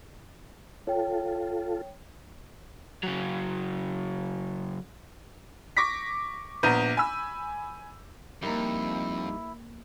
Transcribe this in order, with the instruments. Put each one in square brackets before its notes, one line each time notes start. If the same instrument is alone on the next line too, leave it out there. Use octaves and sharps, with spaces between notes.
[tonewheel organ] F4 A4 [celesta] C#5 G5
[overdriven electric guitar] C#3 F#3
[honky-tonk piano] C#6 D6 A#6 B6
A#1 B3 A#5 G6 D#7
G#5 B5 E6
[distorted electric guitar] F2 [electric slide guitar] G3 D#4 [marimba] A#3 A#4 [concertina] E4